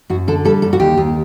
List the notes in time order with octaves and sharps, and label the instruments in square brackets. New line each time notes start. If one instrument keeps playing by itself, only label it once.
[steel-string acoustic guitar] F#2 F#4
D3 A4
G3 A4
F#2 A4
F#4
D#2 G4
D#2